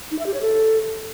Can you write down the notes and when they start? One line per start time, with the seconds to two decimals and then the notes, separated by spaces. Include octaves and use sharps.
0.11 D#4
0.19 E5
0.26 G4
0.34 C#5
0.41 A4